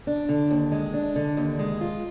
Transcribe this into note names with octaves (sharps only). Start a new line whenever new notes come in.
D4
D3
D#2
G#3
D4
D3
D#2
G#3
F4